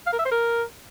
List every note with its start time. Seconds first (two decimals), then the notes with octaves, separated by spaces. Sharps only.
0.06 F5
0.13 A#4
0.19 E5
0.25 C5
0.31 A#4